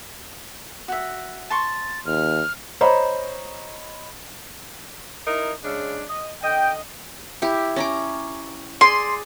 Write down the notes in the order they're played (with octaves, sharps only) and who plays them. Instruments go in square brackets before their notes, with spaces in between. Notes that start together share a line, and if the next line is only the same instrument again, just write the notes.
[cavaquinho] F#4 E5
[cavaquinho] A5 C6 C#6 [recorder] A6
[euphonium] D#2 [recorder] F6
[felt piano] C5 C#5 D#5 A#5 B5
[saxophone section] D#4 E4 A#4
C#3 G#3 D4
D#5
[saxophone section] D3 D#5 [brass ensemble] G5
[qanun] E4 G4
C#4 A#5 D6
[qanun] G#4 D5 [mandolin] C6